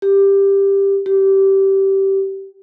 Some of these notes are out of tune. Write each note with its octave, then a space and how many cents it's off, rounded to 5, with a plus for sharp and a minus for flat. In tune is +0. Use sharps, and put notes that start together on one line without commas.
G4 +10
G4 -15